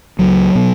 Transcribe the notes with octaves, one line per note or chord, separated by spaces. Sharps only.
C#2 F#3
B2